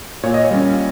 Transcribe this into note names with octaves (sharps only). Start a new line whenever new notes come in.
A#2 C#5
D#5
C#5
G3 C#4